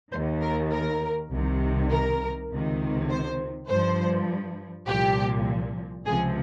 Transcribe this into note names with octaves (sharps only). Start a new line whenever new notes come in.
D#3 C5
D#2
A#4
A#4
C2 C3 D#3
A#4
C#2 C3 D#3
C5
G2 F3 C5
C2 A#2 F3 G4
C#2 C3 F3 G#4